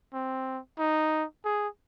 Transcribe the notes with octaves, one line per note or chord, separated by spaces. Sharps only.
C4
D#4
G#4